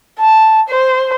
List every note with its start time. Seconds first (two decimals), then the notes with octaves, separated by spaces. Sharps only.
0.19 A5
0.69 C5